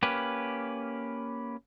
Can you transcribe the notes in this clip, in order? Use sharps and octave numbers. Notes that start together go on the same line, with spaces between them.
A#3 C#4 G4 B4